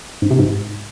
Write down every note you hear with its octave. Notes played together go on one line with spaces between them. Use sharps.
G#2
C3
G#2